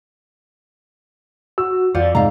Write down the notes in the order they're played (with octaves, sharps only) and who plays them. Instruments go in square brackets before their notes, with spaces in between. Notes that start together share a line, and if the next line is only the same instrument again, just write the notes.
[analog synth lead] F#4 [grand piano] E6
[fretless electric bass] F2 F3 [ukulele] F4 C5 F#5 [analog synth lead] D5
[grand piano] G#2 [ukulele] F5 A#5